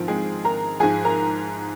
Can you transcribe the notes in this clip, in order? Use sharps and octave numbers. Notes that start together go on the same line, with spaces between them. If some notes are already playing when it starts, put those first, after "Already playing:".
Already playing: G#2 D#3 F3 C4 F4
G#3 G#4
A#4 A#5
G#2 F3 G#4 G#5
A#4 A#5